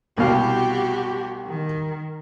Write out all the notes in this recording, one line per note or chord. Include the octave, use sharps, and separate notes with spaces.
C2 B2 F#4 G4 F5
D#3